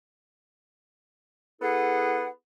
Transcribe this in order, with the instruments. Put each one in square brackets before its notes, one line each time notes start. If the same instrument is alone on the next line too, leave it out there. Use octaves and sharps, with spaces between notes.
[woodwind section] B3 E4 G#4 A4 F#5